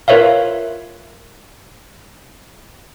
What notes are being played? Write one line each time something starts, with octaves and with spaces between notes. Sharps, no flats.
F4 A#4 B4 C#5 E5 F5